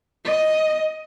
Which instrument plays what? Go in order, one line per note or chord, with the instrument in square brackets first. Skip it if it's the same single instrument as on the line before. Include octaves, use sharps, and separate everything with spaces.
[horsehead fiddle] D#5